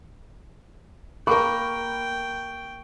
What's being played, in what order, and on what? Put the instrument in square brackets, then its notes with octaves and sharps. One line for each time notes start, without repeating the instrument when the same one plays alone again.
[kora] A#3 [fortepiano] A#4 B5 [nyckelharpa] G5 [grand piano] C#6